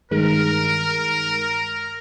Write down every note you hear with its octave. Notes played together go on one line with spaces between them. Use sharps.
G2 D#3 G#3 A#4